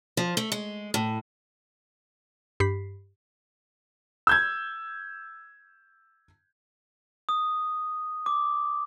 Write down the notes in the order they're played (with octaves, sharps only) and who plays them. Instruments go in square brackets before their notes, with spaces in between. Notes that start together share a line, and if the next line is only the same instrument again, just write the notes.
[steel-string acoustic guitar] F3
A3
G#3
A2
[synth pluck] G2 G4 B5 B6 C7
[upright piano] E6 G6 G#6
[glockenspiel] D#6
D6